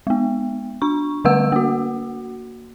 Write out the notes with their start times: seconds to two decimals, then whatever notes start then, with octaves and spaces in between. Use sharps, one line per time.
0.07 G#3 B3
0.82 D4 C#6
1.25 D3 G3 A3 B4 F#5 E6
1.52 A#3 F#4